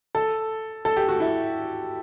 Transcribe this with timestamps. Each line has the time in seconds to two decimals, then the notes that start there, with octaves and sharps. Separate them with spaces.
0.15 A4
0.85 A4
0.97 G4
1.08 F#4
1.20 E4